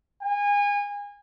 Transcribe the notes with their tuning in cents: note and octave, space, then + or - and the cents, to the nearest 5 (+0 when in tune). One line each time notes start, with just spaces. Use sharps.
G#5 -30